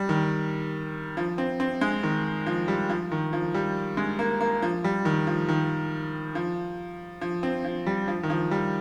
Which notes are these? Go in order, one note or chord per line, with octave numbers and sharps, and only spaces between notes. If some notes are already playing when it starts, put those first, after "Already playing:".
Already playing: G3
D#3
F3
C4
C4
G#3
D#3
F3
G3
F3
D#3
F3
G3
G#3
A#3
A#3
F3
G3
D#3
F3
D#3
F3
F3
C4
F3
G3
F3
D#3
F3
G3